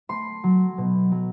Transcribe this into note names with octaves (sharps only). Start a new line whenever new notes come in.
A3 C6
F#3
B2
F#3